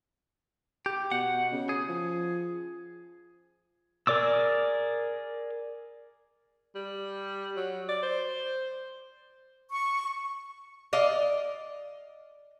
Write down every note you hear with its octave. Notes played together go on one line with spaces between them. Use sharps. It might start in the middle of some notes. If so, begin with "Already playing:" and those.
G4
B2 F#5
C#3
G#4
F3
G#4 A#4 D5 D6 E6
G3
F#3
D5
C5
C#6
D5 D#5 F5